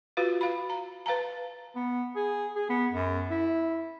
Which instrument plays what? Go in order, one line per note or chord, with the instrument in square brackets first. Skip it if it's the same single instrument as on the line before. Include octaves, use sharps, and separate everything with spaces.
[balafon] F4 F#4 B4 F5
F5 B5
A#5
B4 F5 A5 A#5
[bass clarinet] B3
G#4
G#4
B3
F#2
E4